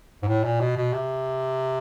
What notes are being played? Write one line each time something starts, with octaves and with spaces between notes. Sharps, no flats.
G#2
A2
A#2
B2
B2
C3